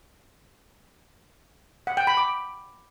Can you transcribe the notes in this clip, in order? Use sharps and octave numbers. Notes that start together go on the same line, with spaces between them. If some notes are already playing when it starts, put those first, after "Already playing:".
F#5
G5
B5
D6